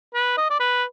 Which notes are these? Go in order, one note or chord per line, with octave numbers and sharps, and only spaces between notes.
B4
D#5
D5
B4